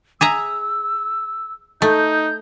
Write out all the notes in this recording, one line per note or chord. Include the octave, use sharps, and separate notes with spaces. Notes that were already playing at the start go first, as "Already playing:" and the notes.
G#4 E5 A#5 E6
A3 D#4 G6